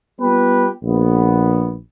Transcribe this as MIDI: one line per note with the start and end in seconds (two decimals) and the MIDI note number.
0.21 0.69 55
0.21 0.69 59
0.21 0.69 65
0.21 0.69 67
0.21 0.69 71
0.83 1.76 34
0.83 1.76 59